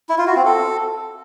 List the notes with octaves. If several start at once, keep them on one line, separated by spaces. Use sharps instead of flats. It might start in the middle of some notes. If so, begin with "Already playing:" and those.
E4
F4
F#4
C4
A4